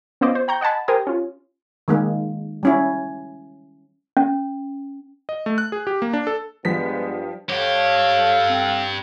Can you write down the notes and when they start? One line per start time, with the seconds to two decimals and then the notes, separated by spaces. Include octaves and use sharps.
0.21 B3 C#4 F4 C5 D5 D#5
0.35 C5
0.48 G5 A#5 C#6 G6
0.61 D#5 F#5 G#5 A5 B5
0.88 G4 A#4 C5 G#5 D#6
1.07 C#4 F4
1.88 D#3 G#3 A#3
2.63 G3 C#4 E4
4.17 C#4
5.29 D#5
5.46 A3
5.58 F#6
5.72 G#4
5.87 G4
6.02 A#3
6.13 D4
6.27 A4
6.65 G2 F3 G#3 B3 B6
7.49 G2 G4 A4 C#5 F5
8.49 C4